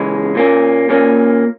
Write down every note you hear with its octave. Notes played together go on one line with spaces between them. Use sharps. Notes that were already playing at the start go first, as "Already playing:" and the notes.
Already playing: C#2 C#3 E3 G#3 C#4
A#2 A#3 C#4
A#2 A#3 C#4